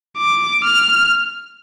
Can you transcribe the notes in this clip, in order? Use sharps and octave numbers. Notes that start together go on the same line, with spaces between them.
D6
F6